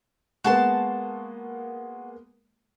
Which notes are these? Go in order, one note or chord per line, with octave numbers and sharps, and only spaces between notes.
G#3 A#3 B3 F#4 A5 C6